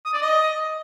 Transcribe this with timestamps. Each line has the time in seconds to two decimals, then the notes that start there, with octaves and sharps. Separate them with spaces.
0.05 D#6
0.13 D5
0.22 D#5